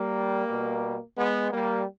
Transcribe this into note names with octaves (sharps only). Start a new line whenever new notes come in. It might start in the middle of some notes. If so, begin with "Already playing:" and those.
Already playing: G3 A#3
B2 G3
G#3 B3
G3 A#3